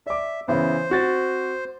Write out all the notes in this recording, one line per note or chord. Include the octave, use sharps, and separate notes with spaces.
D5 E5 D6
C#3 E3 B3 C5
C4 F#4 A6